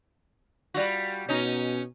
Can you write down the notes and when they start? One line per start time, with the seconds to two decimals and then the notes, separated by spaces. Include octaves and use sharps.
0.74 G3 F4 F#4
1.29 B2 C#4 D#4